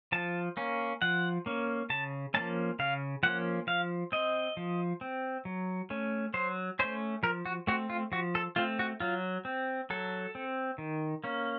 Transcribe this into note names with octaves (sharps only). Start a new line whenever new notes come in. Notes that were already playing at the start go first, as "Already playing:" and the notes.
F3 A5
A#3 C#4
F3 F#5
A#3 C#4
C#3 A5
F3 A#3 C#4 A5
C#3 F5
F3 A#3 C#4 F#5
F3 F5
C4 D#5
F3
C4
F#3
A3 C#4
F#3 C5
A3 C#4 C5
F3 A#4
F#4
A3 C4 F#4
F4
F3 F#4
A4
A3 C4 F4
F#4
F#3 F4
C4
F#3 A4
C4
D#3
A#3 C#4